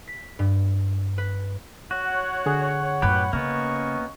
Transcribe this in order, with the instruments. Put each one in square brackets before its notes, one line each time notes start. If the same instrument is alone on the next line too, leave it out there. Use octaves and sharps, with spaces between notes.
[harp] B6
G2
B4
[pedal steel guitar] F#4 [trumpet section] C#5 F#5
[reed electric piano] D3 G#4
[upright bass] F#2 A2 [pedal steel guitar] G4 B4 [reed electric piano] B5
[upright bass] C#3 [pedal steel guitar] A#3 B3 [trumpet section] C#4 D#5 C#6